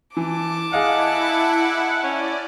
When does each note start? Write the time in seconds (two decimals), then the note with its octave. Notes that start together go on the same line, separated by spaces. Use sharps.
0.17 E3 A5 D6
0.73 E4 G#4 D#5 F5 F#5
2.03 C#4 D5